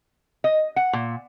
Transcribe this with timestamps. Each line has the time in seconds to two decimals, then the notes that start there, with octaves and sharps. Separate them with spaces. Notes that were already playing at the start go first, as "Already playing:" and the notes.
0.44 D#5
0.76 F#5
0.93 A#2